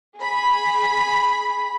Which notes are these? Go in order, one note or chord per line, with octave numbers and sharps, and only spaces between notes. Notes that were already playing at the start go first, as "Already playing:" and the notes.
G#4 B5